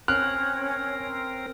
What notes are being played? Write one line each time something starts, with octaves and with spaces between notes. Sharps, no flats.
C4 C#4 A#4 F6 F#6